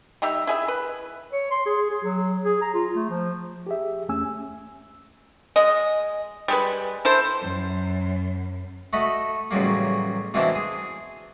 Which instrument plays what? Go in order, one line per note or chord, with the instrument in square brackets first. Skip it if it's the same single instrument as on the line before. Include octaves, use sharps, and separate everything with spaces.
[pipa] G3 D#4 G4 E5
E4 G#4 E5
B4
[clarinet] C#5
C6
G#4
G#4
F#3
G#4
A#5
F4
A3
F3
[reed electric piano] G4 G#4 E5
E2 A3 C#4 G#5 E6
[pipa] G#3 D#5
G3 G#3 B4
E4 A4 C5
[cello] F#2
[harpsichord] A3 F#4 D#5 B5
A1 C#3 F#3 G3 A#3
B2 E3 A#3 C4 D4 E4
G#4